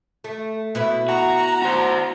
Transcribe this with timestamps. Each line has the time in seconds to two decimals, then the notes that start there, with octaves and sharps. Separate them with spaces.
0.24 A3
0.75 B2 E4 B4
1.08 F#4 A#5
1.62 F#4 C5